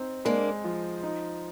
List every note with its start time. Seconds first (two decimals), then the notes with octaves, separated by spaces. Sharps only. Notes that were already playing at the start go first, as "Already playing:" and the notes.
Already playing: C4 D#4
0.25 G#3 A#3 D4
0.64 F3
1.03 D#4